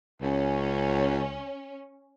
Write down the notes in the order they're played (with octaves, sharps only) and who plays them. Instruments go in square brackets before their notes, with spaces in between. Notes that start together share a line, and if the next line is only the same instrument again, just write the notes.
[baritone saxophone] C#2 [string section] C#4